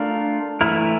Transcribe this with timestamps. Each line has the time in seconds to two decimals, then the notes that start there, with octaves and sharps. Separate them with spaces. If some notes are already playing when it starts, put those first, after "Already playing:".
Already playing: A3 D4 F4 A#4
0.61 E3 A3 E4 A#4